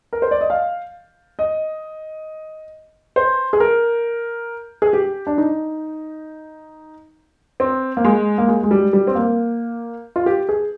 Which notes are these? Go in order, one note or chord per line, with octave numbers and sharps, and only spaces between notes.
A#4
C5
D5
D#5
F5
D#5
C5
G#4
A#4
G#4
G4
D4
D#4
C4
A#3
G#3
A#3
G#3
G#3
G3
G3
C4
A#3
F4
G4
G#4